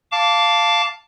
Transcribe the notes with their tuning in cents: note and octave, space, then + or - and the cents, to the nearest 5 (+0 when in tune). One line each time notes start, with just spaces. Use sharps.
F5 +0 A5 +5 D6 -20